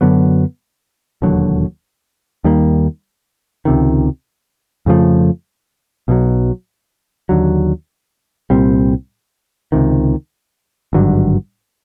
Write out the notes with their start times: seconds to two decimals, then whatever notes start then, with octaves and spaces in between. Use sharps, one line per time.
0.01 F#2 D3 F#3 B3
1.22 E1 D#2 D3 F#3
2.44 D#2 D#3 G3 A#3
3.65 C#2 C3 D#3
4.86 F2 C#3 F3 A3
6.08 B1 B2 F#3
7.29 D#2 D3 F#3
8.50 C2 A#2 G3 C4
9.72 C#2 C3 D#3
10.93 G#1 G2 D3 F#3